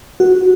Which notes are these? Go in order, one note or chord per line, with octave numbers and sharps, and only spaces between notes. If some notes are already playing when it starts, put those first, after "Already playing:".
F#4